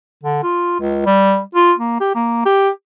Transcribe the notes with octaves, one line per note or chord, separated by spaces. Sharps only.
D3
F4
C#2
G3
F4
A#3
G4
A#3
G4